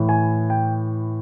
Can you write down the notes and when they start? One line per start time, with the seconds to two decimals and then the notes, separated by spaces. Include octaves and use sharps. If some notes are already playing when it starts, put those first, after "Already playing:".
Already playing: A2 E3
0.09 G#5
0.50 G5